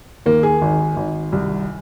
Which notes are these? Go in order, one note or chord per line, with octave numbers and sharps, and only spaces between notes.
D#2 A#3
G#4
G#1
G#1
C2